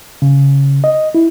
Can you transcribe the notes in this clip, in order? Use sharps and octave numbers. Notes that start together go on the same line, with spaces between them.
C#3
D#5
E4